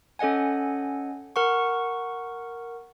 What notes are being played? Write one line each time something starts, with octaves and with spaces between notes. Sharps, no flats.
C#4 A4 D#5 F#5 G#5
A#4 F#5 C#6